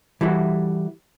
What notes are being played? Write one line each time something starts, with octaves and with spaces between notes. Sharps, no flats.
E3 G3 E4 F#4 A4